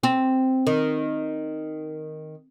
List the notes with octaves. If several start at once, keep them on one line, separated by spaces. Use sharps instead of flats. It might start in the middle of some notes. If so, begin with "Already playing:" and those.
C4
D#3